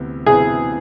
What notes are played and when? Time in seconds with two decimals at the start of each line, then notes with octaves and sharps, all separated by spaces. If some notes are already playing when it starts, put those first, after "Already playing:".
Already playing: D2 C3 E3 B3 E4
0.26 D2 C3 E3 B3 E4 G#4